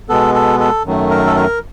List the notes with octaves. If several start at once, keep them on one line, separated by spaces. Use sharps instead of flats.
B2 G#3 B3 A4
A4
A4
F#2 D#3 F#3 A3
A#4
A4
A#4